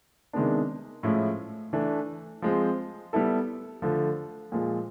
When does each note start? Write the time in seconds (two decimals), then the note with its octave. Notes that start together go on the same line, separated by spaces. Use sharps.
0.33 C3 D#3 G#3 B3 D4
1.03 A2 F3 G#3 C#4 E4
1.73 E3 A3 D4
2.42 F3 G#3 C4
3.13 G3 B3 E4 A4
3.82 D3 F3 A3
4.52 A#2 F3 G#3